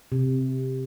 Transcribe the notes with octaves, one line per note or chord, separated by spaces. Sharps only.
C3